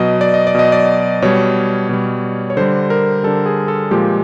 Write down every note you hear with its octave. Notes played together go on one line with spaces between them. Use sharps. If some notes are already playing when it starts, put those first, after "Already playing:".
Already playing: B2 F#3 D#5
D5
D#5
D5
B2 F#3 D#5
D5
B2 G3 C#5
B2 G3
C#5
D3 G3 C5
A#4
D3 G3 A4
G#4
A4
A#2 F3 G#3 G4